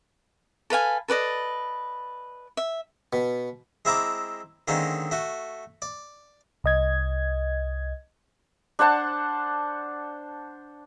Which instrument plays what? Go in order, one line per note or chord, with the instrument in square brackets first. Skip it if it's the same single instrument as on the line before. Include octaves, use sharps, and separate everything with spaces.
[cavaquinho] A4 B4 F5 G#5
A4 B4 D5 D#5
E5
[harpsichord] B2
G#3 C4 E4 E5 A#5 D6
D3 D#3 G#3 A#3 C4 C#4
A3 F#4
D5
[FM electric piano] C2 D#5 G#6
[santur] D4 C5 F#5 A5